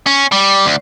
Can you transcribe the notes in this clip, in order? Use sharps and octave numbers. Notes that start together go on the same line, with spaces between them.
C#4
G3
D2